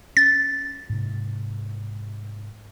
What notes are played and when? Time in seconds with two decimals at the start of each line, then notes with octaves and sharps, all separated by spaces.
0.17 C#4 A6
0.89 G#2 C3